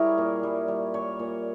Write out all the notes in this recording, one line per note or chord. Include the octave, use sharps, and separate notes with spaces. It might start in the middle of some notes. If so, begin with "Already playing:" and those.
Already playing: G3 E4 G#4 A#4 C#5
A#2
G3
G3
A#2 C#5
A#2